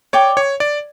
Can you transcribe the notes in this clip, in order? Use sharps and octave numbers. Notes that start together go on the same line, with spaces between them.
C#5 D5 G5 D6
C#5
D5